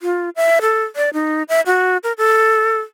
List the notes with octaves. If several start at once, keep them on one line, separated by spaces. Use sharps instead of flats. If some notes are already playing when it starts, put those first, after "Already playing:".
F4
E5
A4
D5
D#4
E5
F#4
A#4
A4